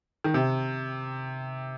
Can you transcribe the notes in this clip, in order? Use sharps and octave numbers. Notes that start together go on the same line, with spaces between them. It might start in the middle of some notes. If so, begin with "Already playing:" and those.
D#3
C3